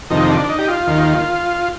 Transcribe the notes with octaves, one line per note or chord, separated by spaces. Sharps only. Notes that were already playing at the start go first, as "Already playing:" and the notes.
F2 C3 D#3 D#4
D4
D#4
G4
F4
D#2 D#3